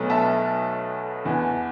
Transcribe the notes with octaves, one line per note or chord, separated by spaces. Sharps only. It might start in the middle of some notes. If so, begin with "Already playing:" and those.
Already playing: B1 B2 F#3 A3
E5 A5
E2 E3 B3